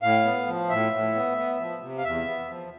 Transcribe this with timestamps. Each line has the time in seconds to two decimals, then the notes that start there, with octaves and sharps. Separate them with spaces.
0.03 A2 F5
0.25 B3
0.47 F3
0.69 A2 E5
0.93 A2
1.15 B3
1.38 B3
1.59 F3
1.82 C3
1.98 F5
2.04 E2 E5
2.27 B3
2.49 F3